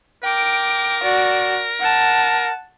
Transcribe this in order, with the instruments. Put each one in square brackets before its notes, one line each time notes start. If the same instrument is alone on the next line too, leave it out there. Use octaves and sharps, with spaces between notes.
[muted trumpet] A#4 [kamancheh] G5 D6
[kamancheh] F#4 D5
F#5 A5